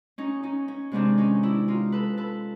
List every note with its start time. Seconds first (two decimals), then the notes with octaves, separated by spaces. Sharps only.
0.18 C#4 D#4
0.43 C#4 D#4
0.68 C#4
0.92 C3 D#3 G#3 B3 C4 D4
1.18 C#4 D#4
1.43 D4 E4
1.68 D#4 F4
1.92 A4 B4
2.18 A4 B4